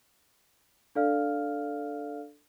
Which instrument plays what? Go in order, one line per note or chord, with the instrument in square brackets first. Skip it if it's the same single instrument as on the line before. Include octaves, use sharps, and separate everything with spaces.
[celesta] D4 A4 D5 F5 F6